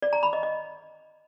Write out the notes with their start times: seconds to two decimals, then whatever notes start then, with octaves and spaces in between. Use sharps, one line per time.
0.02 D5
0.13 A#5
0.23 B5
0.33 D#5
0.43 D#5